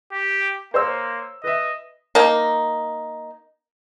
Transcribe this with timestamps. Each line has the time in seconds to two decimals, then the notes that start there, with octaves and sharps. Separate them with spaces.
0.12 G4
0.74 A#3 C5 C#5 E6
1.44 B4 D#5 E5
2.15 A#3 D#4